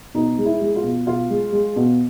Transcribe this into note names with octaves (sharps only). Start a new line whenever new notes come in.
B2 D#4
G#3
E4
G#3
F4
B2
B2 F4
G#3
G#3
B2